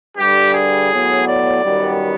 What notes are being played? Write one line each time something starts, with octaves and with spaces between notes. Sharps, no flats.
G2 D3 G3 G4
G#4
A2 F#3 B3
D5
F#2 D#3 G3 B3